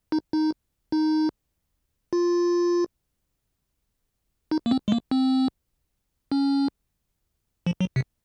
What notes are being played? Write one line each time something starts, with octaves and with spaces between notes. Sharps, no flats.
D#4
D#4
D#4
F4
D#4
A#3
C4
G#3
A#3
C4
C#4
F3
F#3
C3